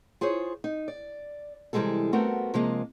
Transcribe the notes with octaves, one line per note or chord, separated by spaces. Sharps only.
F4 G#4 C5 C#5
D#4
D5
C3 E3 G3 G#3 G#4 A4
A3 B3 C4 F#4 A4 A#4
C3 F3 G#3 A#3